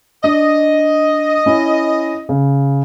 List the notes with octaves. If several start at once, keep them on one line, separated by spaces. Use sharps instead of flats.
D4 D#5
C#4 E4
C#3